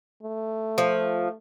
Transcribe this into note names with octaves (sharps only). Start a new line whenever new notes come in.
A3
F3